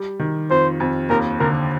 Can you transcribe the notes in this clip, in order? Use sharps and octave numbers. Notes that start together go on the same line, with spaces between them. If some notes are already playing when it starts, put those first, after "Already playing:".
Already playing: G3
D#3
F2 C5
F2
D#2 A#4
D3 A#4